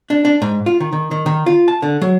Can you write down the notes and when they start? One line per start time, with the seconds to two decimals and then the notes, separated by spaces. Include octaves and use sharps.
0.10 D4
0.25 D4
0.42 G#2
0.66 F4
0.80 D#3
0.93 D#3
1.11 D#3
1.26 D#3
1.46 F4
1.68 A5
1.82 D3
2.01 F#3